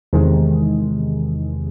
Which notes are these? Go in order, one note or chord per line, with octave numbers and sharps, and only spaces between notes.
E2 C3 D#3 G#3